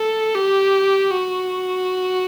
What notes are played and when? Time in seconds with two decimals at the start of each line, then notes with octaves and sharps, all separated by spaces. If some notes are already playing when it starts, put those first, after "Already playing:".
Already playing: A4
0.35 G4
1.10 F#4